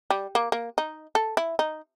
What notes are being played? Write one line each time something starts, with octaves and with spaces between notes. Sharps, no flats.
G3
A#3
A#3
D#4
A4
E4
D#4